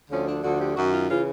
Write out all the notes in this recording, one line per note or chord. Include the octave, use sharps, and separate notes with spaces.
D2 D3 F3 C#4
D4
D2 D3 F3 F#4
G4
F#2 D#3 F#4
F4
C#3 E3 F4